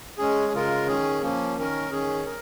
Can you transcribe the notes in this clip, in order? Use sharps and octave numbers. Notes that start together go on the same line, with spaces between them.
G#3 C#4 G#4
C#3 G#3 F4 A#4
D#3 C#4 G#4
F3 A#3 C#4
D#3 C#4 A#4
D#3 C#4 G#4
A#4